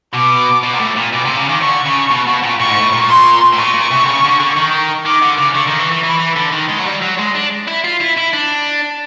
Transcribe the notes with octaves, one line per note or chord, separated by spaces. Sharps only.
B2 D6
B2
A#2
A2
A#2
B2 D6
C3
C#3
D#3
D3 C#6
C#3
B2
B2
A#2
A2 C#6
G#2
A2
A#2
C6
A2
A#2 C#6
A#2
C3
D3
C#3
D3
D3
D#3
D#3 D6
D3
C#3
D3 C#6
D#3
E3
E3
E3 B5
E3
D3
D#3
G#3
F#3
G3
F#3
G#3
D4
E4
F4
E4
E4
D4